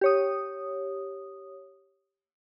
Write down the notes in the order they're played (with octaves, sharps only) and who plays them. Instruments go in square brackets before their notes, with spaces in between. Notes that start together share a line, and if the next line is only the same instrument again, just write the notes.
[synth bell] G4 C#5 D#6